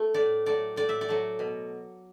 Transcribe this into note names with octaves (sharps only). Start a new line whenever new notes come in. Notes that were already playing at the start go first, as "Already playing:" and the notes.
Already playing: A3
A2 D5
F#3 A3 D5
A2 D5
E5
D5
F#3 A3
B2